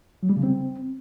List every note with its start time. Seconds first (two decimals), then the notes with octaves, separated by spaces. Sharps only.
0.23 F#3
0.30 G3
0.36 C#3
0.43 C4